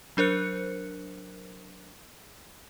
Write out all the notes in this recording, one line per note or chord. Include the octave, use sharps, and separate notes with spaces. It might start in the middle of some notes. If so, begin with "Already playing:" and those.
F#3 D4 A#4 C5 F#6 C#7